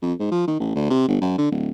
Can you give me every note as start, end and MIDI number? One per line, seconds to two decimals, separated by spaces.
0.02 0.13 41
0.20 0.30 44
0.31 0.43 53
0.48 0.55 51
0.60 0.71 33
0.75 0.89 38
0.90 1.06 48
1.08 1.17 31
1.22 1.35 42
1.38 1.50 50
1.51 1.70 26